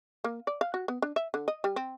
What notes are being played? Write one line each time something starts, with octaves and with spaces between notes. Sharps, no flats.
A#3
D5
F5
F#4
B3
D4
E5
D3
D#5
G3
C4